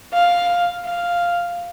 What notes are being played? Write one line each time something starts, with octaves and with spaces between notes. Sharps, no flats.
F5
F5